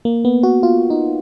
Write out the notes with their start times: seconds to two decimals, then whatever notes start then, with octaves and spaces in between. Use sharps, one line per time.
0.05 A#3
0.25 B3
0.43 F#4
0.63 F4
0.90 D#4